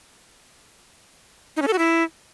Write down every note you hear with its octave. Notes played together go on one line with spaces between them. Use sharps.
D#4
C#4
A4
F#4
E4